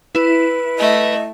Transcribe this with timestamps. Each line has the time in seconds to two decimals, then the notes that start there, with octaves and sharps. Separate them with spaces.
0.15 E4 B4
0.79 A3 D#5 E5